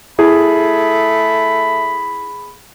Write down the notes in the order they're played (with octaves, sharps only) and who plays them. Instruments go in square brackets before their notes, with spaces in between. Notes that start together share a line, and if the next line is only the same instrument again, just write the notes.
[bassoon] A3 [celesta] E4 [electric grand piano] G#4 [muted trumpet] B5